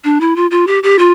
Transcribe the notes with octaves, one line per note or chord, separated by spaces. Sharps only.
D4
E4
F4
F4
G4
G4
F4